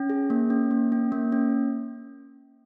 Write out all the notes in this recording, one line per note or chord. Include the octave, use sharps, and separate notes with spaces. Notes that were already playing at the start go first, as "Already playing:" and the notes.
Already playing: C#4
G#4
A#3
C#4
A#3
C#4
A#3
C#4